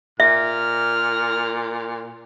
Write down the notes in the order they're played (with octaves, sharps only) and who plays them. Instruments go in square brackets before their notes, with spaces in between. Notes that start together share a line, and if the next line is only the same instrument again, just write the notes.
[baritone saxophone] A#2 [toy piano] E5 [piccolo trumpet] F6